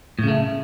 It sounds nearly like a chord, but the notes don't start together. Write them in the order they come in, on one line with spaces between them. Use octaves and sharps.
A2 C#3 A3